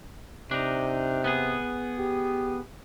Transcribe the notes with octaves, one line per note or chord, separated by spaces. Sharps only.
C3 D4 D#4
B3 G#4
G4